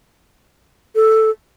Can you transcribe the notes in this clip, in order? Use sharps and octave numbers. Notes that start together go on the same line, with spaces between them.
A4